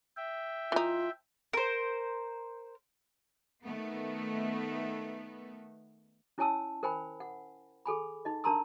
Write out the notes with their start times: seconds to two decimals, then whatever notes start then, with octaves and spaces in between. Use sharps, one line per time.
0.17 E5 G5
0.72 E3 D#4 F4
1.53 A#4 C5
3.64 D#3 A3 B3
6.38 C#4 E4 C#5 G#5 A5 E6
6.83 A#4 C5 G5 G#5 B5
7.20 F#5
7.86 G#4 A4 G#5 B5
8.25 D#4 D#5
8.44 D4 A#4 A5 A#5 C6 E6